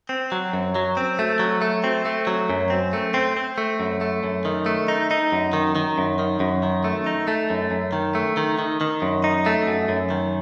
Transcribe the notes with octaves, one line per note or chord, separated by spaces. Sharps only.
C4
F#3
F#2
F#3
C4
A3
F#3
A3
C4
A3
F#3
F#2
C4
A3
C4
C4
A3
F#2
A3
F#2
D#3
A3
D#4
D#4
F#2
D#3
D#3
F#2
D#3
F#2
D#3
A3
D#4
A3
F#2
F#2
D#3
A3
D#3
D#3
D#3
F#2
D#4
A3
F#2
F#2
D#3